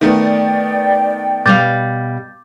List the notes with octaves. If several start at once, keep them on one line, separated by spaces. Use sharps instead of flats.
D#3 A3 B3 D5 G5
B2 G3 F5 D6 G6 A6